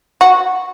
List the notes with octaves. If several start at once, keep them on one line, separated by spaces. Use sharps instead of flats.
F#4